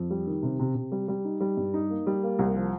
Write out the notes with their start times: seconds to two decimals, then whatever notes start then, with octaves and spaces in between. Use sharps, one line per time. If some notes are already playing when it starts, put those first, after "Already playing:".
Already playing: F2
0.10 G3
0.27 D#3
0.43 C3
0.59 C3
0.75 C3
0.92 G3
1.08 G3
1.25 D#4
1.40 G3
1.57 G2
1.74 D#4
1.90 A#3
2.07 G3
2.23 A#3
2.39 C2
2.56 F3